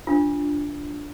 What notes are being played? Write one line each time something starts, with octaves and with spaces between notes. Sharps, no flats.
D4 F4